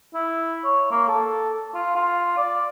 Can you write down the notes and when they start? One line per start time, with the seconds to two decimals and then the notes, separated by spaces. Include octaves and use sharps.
0.14 E4
0.64 C#5
0.91 A#3
1.08 A4
1.74 F4
1.96 F4
2.37 D5